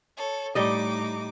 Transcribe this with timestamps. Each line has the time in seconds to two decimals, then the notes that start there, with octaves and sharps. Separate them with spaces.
0.17 A4 C#5
0.55 A2 G3 D#4 D#5 D6